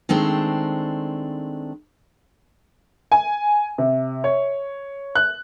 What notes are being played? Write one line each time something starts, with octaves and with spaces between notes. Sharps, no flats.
D#3 G#3 A3 C4 D4
G#5
C3
C#5
F#6